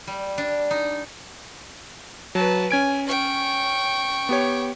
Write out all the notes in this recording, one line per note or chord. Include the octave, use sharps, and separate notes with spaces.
G3
D4
D#4
F#3 B4 A5
C#4 G#5 G#6 D7
G5 C#6
B3 G4 C#5